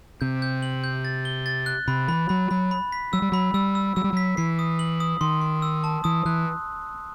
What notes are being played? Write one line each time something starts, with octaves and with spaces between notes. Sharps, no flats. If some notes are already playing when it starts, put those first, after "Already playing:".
C3 G6
G6
F#7
G6
A6
G7
A6
F#6
C3 B5
E3 B5
F#3 B5
F#3 B5
B5
B6
F#3 E6
G3
F#3 B5
G3 E6
E6
F#3 E6
G3
F#3 B6
E3 C7
D#6
F#7
D#6
D#3 C6
C6
E6
A5
E3 D#6
E3 F#6